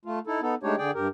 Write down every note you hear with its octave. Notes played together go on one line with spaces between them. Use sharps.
A3 F4
D#4 E4 A4
B3 D#4 A4
G#3 A3 D4 D#4 G4 C#5
D3 G#4 D5 G5
G2 G4 A#4